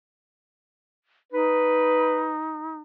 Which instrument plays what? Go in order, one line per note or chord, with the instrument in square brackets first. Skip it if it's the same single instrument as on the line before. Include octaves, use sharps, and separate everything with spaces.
[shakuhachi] D#4 [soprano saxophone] B4